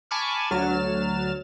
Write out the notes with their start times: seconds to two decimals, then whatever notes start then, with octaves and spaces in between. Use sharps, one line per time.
0.11 G#5 A5 B5 C#6 D6 F6
0.51 D2 F#3 F6 A6 E7